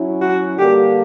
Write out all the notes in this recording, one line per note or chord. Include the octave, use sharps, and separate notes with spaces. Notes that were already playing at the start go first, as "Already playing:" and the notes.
Already playing: F#3 C#4 E4
F#4
D3 G3 A#3 G4